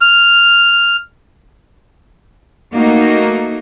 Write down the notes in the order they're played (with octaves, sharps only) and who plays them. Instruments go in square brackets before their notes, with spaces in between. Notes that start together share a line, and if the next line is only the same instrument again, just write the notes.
[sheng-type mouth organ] F6
[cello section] A3 A#3 D#4 F#4